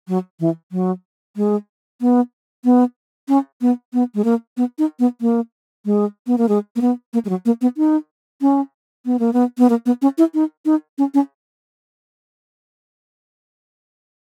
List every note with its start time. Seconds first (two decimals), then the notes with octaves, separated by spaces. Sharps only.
0.08 F#3
0.40 E3
0.72 F#3
1.36 G#3
2.01 B3
2.64 B3
3.28 C#4
3.61 B3
3.93 B3
4.15 G#3
4.24 A#3
4.57 B3
4.79 D#4
5.00 B3
5.21 A#3
5.85 G#3
6.27 B3
6.38 A#3
6.49 G#3
6.76 A#3
6.81 B3
7.13 A#3
7.25 G#3
7.29 F#3
7.45 A#3
7.61 B3
7.77 D#4
8.41 C#4
9.06 B3
9.19 A#3
9.33 B3
9.58 B3
9.70 A#3
9.86 B3
10.02 C#4
10.18 E4
10.34 D#4
10.65 D#4
10.98 C#4
11.14 C#4